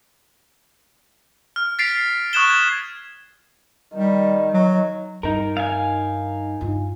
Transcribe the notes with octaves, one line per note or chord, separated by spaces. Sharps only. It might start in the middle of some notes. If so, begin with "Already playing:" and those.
F6
A6 B6 C7 D7 F7
C#6 D#6 F#6 G#6 E7 G7
G#6 E7
D#3 G3
F#3
G2 D#4 A#4
F5 G#5
G2 F4